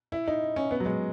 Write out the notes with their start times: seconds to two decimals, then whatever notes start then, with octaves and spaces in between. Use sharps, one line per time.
0.12 E4
0.28 D#4
0.56 C#4
0.71 B3
0.80 F#3
0.86 G#3